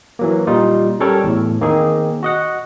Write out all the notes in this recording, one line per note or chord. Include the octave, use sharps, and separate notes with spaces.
E3 F#3 A#3
A#2 G3 D#4 F4
G3 C#4 A4 A#4 C#5 G5
E2 A2
D#3 A#3 C4 D#4 G#4
F#4 D#5 F#5